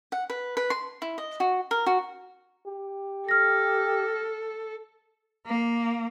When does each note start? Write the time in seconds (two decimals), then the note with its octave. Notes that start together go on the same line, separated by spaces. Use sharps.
0.12 F#5
0.30 B4
0.57 B4
0.70 C6
1.02 E4
1.18 D#5
1.40 F#4
1.71 A#4
1.86 F#4
2.66 G4
3.29 A4 F6 A#6
5.45 A#3